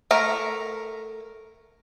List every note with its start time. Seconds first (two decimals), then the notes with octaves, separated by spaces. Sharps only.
0.11 A3 A#4 A#5